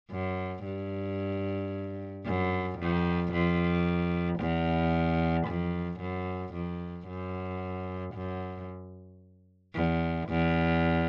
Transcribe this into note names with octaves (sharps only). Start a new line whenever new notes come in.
F#2
G2
F#2
F2
F2
E2
F2
F#2
F2
F#2
F#2
E2
E2